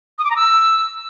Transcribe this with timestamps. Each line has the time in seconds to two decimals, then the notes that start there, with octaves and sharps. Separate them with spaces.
0.19 D#6
0.25 D6
0.30 A#5
0.36 E6